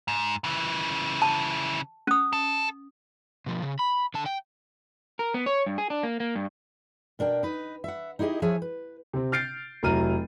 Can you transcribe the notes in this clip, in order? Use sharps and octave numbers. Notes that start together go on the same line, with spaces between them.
G#2
C#3 E3
A5
C#4 D#6
A4
B2 F3
C#3
B5
D3 A5
G5
A#4
B3
C#5
G2
G#4
D4
A#3
A#3
G2
B2 D4 A#4 G5
D#4 B4
E5 F#5
D#4 E4 G4 G#4 D#5
F3 G#4 C#5 E5 G#5
B4
C3 C4
F6 G6 A6 C7 D7
F1 F#3 E4 A#5 F6 D#7